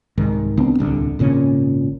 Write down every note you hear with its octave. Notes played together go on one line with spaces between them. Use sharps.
C2 G#2 D#3
C2 B3 C4 D4
D1 C2 D3
G#1 A#2 C#3 C#4